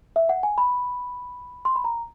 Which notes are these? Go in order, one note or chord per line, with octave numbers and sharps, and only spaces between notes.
E5
F#5
G#5
B5
C6
B5
A#5